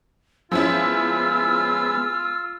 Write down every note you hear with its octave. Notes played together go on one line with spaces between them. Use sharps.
F3 G#3 B3 C#4 E4 F4 E6